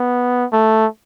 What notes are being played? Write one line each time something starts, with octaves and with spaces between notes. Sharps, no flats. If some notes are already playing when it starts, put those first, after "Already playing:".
Already playing: B3
A3